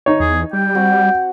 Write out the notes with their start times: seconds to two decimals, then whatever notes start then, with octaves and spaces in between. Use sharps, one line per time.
0.06 D#4 C#5
0.20 E2 G#4
0.53 G3 G5
0.75 C4 F#4 F#5